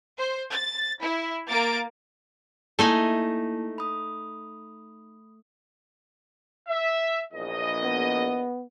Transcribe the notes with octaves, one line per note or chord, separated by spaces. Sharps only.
C5
A6
E4
A#3 A#4 D6 A6 D7
A3 A#3 D#4 E4 G#5 A5
B5 D#6
E5
A#1 E2 D#5
B3